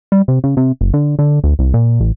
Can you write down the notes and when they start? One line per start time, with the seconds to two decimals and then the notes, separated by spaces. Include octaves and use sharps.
0.12 G3
0.28 C3
0.44 C#3
0.57 C3
0.81 F#1
0.94 D3
1.19 D3
1.44 D2
1.59 C2
1.74 A#2
2.00 A1